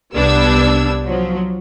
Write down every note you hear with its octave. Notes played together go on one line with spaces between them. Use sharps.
C2 G3 B3 D4 E6 G#6
F3 F#3